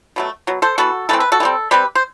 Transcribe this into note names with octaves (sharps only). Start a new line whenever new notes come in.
B2 F#3 A3
B2 F#3
A4 C5
E3 B3 F#4 A4
E3 A3 C4 A4
B4
F#4 A4
E3
G3 C4
C3 G3 C4 G4 B4
C5